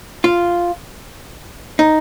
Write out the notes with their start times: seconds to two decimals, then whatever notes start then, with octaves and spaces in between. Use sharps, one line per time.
0.24 F4
1.79 D#4